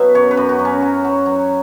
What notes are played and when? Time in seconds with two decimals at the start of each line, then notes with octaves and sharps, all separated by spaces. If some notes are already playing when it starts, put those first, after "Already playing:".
Already playing: B2 F#3 E5
0.15 F#2 C#5
0.31 B4
0.37 F#2
0.49 F#4
0.59 F#2
0.65 C#4
0.82 F#3
1.05 F#3
1.26 F#3